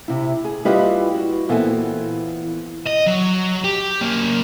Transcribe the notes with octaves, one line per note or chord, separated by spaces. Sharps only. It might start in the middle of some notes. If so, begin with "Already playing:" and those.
C3 E4
G#4
G3 E4 F4 G4 B4 D#5
F#4
A#2 E3 B3 C4 A4 G#5
D#5
F#3
G4
F#3 A#3